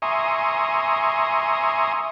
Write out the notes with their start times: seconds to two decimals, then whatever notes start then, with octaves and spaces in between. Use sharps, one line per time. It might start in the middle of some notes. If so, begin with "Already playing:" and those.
0.02 E5 G#5 A#5 C6 C#6 D#6